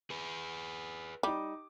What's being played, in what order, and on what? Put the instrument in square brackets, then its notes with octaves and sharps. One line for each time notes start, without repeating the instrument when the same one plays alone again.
[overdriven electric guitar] G#4 B4
[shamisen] G3 [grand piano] D#4 D6